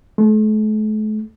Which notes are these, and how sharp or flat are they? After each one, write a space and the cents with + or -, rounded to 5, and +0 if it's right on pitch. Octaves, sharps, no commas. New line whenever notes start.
A3 -40